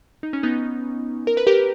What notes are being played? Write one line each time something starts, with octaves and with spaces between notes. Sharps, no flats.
D#4
C#4
B3 D#4
A#4
B4
G4 A#4